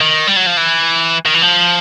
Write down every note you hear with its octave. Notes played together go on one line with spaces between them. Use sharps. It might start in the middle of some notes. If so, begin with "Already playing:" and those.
D#3
G3
F#3
F3
E3
D#3
E3
F3